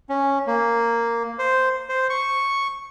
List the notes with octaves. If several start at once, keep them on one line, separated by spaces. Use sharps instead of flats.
C#4
A#3
C5
C5
C#6